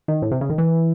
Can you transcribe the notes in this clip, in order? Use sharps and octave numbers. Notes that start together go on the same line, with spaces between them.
D#3
A2
C3
C#3
D#3
E3